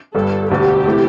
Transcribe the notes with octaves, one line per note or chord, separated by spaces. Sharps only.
G1 G2 G3 A4
E1 D2 D3 G4
C3 E3 A3 E4